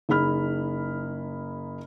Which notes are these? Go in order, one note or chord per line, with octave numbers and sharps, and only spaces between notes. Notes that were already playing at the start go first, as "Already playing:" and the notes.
F#1 D#4 G#4 B5 F6